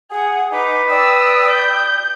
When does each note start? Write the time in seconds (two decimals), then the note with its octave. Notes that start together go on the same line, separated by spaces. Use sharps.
0.11 G#4 F#5 D#6
0.52 D#4 B4 D6
0.89 D5 G5 D#6 E6
1.51 G6